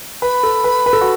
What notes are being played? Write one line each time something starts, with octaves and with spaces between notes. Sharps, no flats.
B4 B5
A4
B4
B4
A4
F#4